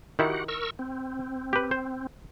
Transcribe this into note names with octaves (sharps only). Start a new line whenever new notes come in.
D#3 E4 F#4 G4 F#5
A#4 C#6 E6
C4
G4 B4
C5